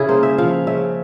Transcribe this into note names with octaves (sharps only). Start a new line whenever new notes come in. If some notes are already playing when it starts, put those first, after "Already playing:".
Already playing: C#3 E4 G#4
A#3 C5
E5
F3 F5
C#3 E5